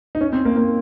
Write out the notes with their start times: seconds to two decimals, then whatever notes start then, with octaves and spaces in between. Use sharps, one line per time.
0.15 D#4
0.21 C#4
0.33 C4
0.45 A#3
0.57 A#3